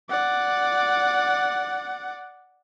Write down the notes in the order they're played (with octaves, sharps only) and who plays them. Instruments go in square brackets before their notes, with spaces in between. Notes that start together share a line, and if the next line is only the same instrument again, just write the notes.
[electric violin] D5 F#5